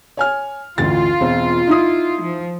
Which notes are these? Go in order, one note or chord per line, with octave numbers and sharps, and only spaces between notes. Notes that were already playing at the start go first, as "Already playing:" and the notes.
C#5 G#5 F6
A1 D2 F4 A6
E1 C4 C5
D#4 E4 D#6
F3